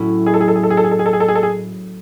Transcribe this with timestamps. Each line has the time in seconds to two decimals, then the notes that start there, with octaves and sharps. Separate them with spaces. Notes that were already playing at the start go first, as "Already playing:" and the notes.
Already playing: A2 F#3 C#4 E4
0.26 G#4
0.34 A4
0.41 G#4
0.48 A4
0.56 G#4
0.63 A4
0.70 G#4
0.77 A4
0.84 G#4
0.91 A4
0.99 G#4
1.06 A4
1.13 G#4
1.20 A4
1.28 G#4
1.35 A4
1.43 G#4